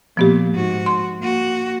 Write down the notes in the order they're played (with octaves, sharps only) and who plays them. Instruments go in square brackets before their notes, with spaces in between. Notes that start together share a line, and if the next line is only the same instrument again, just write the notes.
[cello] A#2 [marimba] F3 B3 G4
[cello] G#2 F#4
[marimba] C6
[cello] A#3 F#4